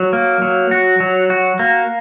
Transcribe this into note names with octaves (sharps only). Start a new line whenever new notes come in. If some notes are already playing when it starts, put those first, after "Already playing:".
Already playing: F#3
A#3
F#3
F#4
F#3
F#4
A#3